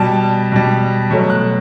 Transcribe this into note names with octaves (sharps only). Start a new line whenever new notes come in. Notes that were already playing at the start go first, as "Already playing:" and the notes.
Already playing: B2 G3 A5
B2 G3
B2 F#3 A3
F#6